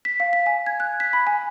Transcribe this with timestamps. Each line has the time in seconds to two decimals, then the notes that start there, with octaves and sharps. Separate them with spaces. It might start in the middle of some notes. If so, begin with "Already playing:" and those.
0.05 B6
0.20 F5
0.33 B6
0.46 G#5
0.66 G#6
0.80 F#6
1.00 B6
1.13 B5
1.27 G#5